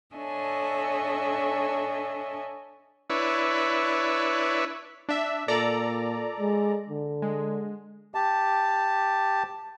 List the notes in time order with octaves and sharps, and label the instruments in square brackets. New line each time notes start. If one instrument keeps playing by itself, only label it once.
[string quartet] D4 A4 C#5 D#5 E5 G#5
[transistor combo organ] D4 E4 B4 C#5
[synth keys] D4 E5
[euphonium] A#2 [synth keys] A4 D5 A#5
[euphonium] G#3
D3
[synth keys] G#3
[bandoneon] G4 A5